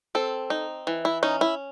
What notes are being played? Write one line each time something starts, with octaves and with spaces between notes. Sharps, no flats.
C4 A4
D#4
E3
E4
C#4 D#4
E4